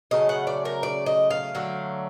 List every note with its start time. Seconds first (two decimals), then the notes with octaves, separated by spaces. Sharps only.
0.11 C#3 F#3 A3 D#5
0.29 F#5
0.47 D5
0.65 A#4
0.83 D5
1.06 D#5
1.31 F5
1.55 D3 F#3 A3